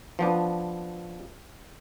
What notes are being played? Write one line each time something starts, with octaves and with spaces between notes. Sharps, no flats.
F3 B3 D4